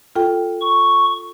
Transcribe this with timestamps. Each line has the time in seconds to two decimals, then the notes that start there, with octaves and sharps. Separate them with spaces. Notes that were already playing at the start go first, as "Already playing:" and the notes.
0.15 F4 A4 G5
0.61 C#6